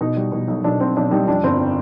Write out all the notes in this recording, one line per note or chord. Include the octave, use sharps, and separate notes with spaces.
B2 D#4
G3
B2
B1
B1 D4
B1 C4
B1 D4
G3 D#4
F2 D4
G1 C4